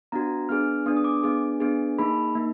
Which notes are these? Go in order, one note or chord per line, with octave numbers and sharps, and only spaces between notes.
B3 D4 F#4 A#5
B3 D4 G#4 F6
B3 D4 G#4 D#6
D#6
D6
B3 D4 G#4
B3 D4 G#4
A#3 D#4 G#4 B5
A#3 D#4